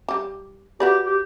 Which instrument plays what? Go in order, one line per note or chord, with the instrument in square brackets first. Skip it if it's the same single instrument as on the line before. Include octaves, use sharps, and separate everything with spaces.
[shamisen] G3 G4
[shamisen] F#4 B4 D5 [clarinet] G4
[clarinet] G4